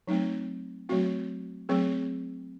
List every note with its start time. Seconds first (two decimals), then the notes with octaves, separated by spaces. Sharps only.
0.08 F#3 A3 C4 D#4
0.89 F#3 A3 C4 F#4
1.69 F#3 A3 C4 G#4